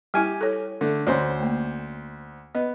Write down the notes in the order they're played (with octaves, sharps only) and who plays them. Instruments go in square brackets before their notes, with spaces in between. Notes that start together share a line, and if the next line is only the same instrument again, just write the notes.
[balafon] G3 E4 [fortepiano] G4 G#5
[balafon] A4 C#5
[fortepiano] D3 A3
[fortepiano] D2 C5 [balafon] C#4 C#5 G#5
[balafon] A3 A#3
[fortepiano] B3 [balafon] D#5